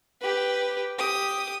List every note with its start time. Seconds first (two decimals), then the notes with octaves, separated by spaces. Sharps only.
0.21 G4 B4
0.98 G4 D#6